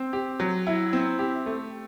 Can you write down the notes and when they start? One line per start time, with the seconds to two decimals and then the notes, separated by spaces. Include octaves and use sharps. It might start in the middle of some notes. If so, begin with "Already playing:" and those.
Already playing: C4
0.13 G4
0.40 F#3
0.67 E4
0.93 C4
1.19 G4
1.46 A3